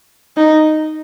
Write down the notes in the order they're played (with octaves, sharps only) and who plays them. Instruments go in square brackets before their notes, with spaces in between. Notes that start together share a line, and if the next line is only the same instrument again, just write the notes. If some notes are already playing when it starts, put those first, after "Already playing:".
[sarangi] D#4